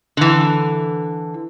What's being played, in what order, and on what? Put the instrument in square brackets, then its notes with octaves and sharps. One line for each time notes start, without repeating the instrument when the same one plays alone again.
[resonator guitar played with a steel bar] D3 E3